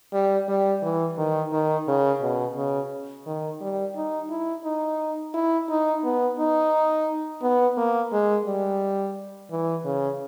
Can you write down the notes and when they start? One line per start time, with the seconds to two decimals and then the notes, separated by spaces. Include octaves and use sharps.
0.13 G3
0.48 G3
0.83 E3
1.18 D#3
1.52 D#3
1.88 C#3
2.21 B2
2.56 C#3
3.27 D#3
3.61 G3
3.96 D#4
4.30 E4
4.64 D#4
5.34 E4
5.70 D#4
6.04 B3
6.39 D#4
7.42 B3
7.77 A#3
8.12 G#3
8.46 G3
9.51 E3
9.85 C#3